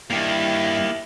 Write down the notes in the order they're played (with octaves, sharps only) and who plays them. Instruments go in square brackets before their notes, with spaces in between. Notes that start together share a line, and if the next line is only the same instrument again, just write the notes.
[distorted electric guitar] G2 [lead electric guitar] A#3 G4 [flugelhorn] E4